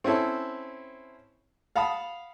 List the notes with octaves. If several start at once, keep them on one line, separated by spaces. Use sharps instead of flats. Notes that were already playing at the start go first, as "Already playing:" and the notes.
C4 C#4 E4 A4
F5 F#5 A5 B5 D#6